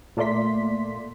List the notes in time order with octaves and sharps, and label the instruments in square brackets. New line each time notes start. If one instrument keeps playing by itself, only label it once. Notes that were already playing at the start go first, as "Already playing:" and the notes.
[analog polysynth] A#2 A3 A#3 D5 C6 B6